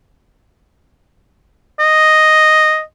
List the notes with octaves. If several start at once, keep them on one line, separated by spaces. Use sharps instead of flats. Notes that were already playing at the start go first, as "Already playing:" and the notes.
D#5